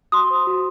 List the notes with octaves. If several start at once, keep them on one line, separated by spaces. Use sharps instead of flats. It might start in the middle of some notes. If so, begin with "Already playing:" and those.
F#4 C6 D#6
C5
F#4